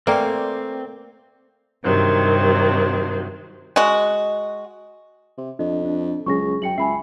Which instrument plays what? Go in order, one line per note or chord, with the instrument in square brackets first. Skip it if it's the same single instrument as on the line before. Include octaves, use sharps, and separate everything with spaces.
[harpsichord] A3 F4 G#5 [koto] A#3 [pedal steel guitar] C4 [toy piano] B4 D5 G5
[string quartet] G2 C3 D#3 F#3 C4
[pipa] G#3 F#4
[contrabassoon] C3
[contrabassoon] F2 [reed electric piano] D4 [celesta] D#5
[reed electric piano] D4
[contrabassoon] C#2 [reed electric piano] F#3 C#4 G#4 [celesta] C#6 A#6
[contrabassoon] F#2 [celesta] G5 C#7 F#7
[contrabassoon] C#2 [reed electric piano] E5 [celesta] G#5 B5 C7